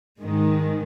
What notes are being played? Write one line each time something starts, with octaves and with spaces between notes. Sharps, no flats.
G#2 D#3 G#3